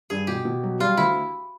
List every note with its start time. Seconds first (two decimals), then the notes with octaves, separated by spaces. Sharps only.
0.10 G2 G#4
0.27 B2 G4
0.45 B2
0.63 F#3
0.80 G3 F4
0.97 D2 E4